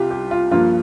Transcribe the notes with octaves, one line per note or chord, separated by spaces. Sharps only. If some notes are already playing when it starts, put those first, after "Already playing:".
Already playing: C2 F4 G4
G4
F4
G2 F3 A#3 F4